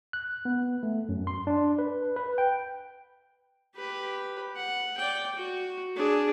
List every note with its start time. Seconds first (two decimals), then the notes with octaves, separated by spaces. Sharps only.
0.13 F#6
0.45 B3
0.83 A3
1.09 F#2
1.27 C6
1.47 D4
1.79 B4
2.16 B4
2.38 G5
3.76 G4 B4
4.56 F#5
4.98 D5 G5
5.35 F#4
5.96 D4 G#4